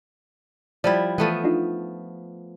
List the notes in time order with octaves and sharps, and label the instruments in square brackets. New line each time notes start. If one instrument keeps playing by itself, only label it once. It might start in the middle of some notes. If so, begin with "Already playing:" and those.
[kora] F3 G3 E4 [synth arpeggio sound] D5
[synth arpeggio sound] E3 D#7 [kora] F3 A3 B3
[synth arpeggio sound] D4 D#4 F4